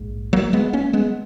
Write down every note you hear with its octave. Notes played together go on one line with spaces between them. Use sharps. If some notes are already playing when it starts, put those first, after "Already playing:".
Already playing: A#1 G#2
F#3 A#3
G#3 B3
A#3 C#4
G#3 B3